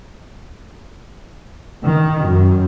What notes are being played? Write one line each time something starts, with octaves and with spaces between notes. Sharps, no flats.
D#3
F#2